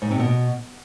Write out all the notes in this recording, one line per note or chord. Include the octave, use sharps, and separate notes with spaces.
G#2
C3
B2